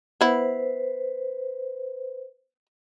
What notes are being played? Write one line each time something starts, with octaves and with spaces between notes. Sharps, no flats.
B3 E4 B4 C5